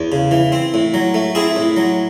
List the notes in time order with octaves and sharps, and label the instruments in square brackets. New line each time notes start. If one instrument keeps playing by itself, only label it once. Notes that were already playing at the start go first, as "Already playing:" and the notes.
Already playing: [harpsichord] E2
C#3
E3
C4
A2
F#3
A3
C4 E4 G#4
A2
F#3